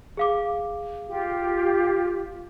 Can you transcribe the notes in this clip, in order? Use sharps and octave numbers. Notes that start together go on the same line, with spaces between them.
G#4 F5 D6
F4 G4